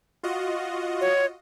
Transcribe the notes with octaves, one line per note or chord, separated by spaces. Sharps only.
F4 F#4 D#5
C#5